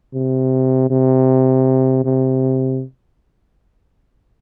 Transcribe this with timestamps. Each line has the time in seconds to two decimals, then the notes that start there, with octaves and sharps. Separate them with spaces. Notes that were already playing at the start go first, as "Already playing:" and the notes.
0.14 C3
0.90 C3
2.05 C3